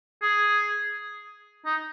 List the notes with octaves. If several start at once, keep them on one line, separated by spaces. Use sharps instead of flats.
G#4
D#4